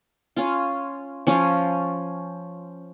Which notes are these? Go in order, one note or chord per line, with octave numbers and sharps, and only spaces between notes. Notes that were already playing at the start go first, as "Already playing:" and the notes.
C#4 F4
F3 C#4 F4